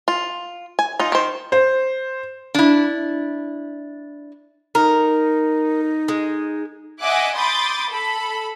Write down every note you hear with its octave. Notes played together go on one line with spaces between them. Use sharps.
F4
G#5
D#4 F4
D#3 C5
C5
D4 E4
D#4 A#4
G#3
D#5 E5 F#5 G#5 D6 F#6
B5 C6 D6 D#6 G6 A6
A4 B5